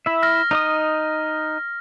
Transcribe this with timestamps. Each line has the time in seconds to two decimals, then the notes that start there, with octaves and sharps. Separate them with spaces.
0.06 E4 E5
0.23 F6 A#6
0.51 D#4 D#5 D#6